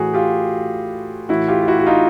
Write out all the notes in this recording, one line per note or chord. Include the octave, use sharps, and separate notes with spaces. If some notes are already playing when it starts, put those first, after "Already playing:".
Already playing: A2 E3 F#4 G#4
F4 G4
A2 E3 E4 F#4
F4 G4
F4
E4 F#4
F#4
D#4 F4